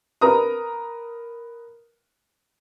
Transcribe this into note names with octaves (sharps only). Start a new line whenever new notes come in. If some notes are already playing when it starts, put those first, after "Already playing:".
A#4 B4 A#5 D#6